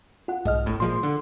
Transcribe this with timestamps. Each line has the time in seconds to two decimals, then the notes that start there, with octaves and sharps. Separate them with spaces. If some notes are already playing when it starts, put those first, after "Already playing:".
0.28 F4 F#5
0.45 B1 G#2 D#5 F6
0.66 G#1 A2
0.80 A#2 F3 G#3 C6
1.03 D3